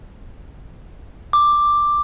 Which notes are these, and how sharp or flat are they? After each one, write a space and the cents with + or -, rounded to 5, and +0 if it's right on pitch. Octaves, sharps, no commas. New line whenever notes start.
D6 +5